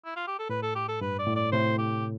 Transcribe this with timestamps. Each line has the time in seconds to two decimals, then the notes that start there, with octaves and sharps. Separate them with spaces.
0.05 E4
0.16 F4
0.27 G4
0.39 A4
0.49 A2 B4
0.63 A4
0.75 G4
0.88 A4
1.01 G2 B4
1.19 D5
1.27 A2
1.36 D5
1.52 A2 C3 C5
1.79 G4